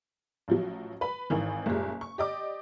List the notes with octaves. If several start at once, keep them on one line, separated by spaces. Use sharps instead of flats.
A1 F3 F#3
B4 B5
G#1 D#3 E3
F#1 A#2 G3 G#3
C#6
G4 D5 D#5 D6